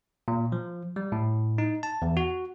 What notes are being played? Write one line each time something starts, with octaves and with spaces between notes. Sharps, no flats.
A#2
F3
G3
A2
D#4
A5
E2
F#4